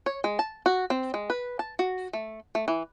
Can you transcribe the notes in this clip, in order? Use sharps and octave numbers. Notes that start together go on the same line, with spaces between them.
C#5
G#3
A5
F#4
C4
G#3
B4
A5
F#4
A3
A3
E3